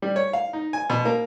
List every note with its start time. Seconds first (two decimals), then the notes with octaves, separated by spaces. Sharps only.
0.02 G3
0.16 C#5
0.33 F5
0.53 D#4
0.73 G#5
0.90 B2
1.05 A#3